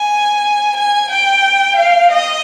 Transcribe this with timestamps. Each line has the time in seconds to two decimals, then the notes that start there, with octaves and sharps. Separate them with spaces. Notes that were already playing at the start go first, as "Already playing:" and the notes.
Already playing: G#5
0.76 G#5
1.10 G5
1.76 F5
2.09 D#5